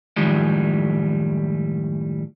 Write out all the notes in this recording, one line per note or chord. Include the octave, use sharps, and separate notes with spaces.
F#2 A2 D#3 F3 G3 G#3